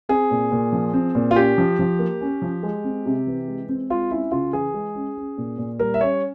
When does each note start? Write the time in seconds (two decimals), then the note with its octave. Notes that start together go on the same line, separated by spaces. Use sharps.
0.09 C4 G#4
0.31 A#2
0.52 A#2
0.73 F3
0.93 C4
1.15 A#2
1.31 F4
1.36 C#4 G4
1.58 F3
1.79 F3
1.99 A#3
2.21 C#4
2.42 F3
2.63 G#3
2.84 C4
3.06 C3
3.27 E3
3.48 G#3
3.69 C4
3.90 G#3 F4
4.11 C#4 E4
4.31 C#3 F4
4.53 E3 G#4
4.74 G#3
4.95 C#4
5.17 C#4
5.38 A#2
5.58 A#2
5.79 G3 A#4
5.94 E5
6.01 C#4 C#5